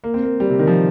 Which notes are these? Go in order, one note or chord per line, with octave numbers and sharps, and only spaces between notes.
A#3
C4
A#3
G3
C3
D#3
F3